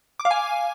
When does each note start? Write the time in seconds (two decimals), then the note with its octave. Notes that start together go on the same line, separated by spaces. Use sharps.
0.20 D6
0.25 F5
0.31 G#5